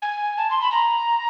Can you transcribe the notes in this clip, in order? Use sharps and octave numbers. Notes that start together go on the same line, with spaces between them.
G#5
A5
C6
B5
A#5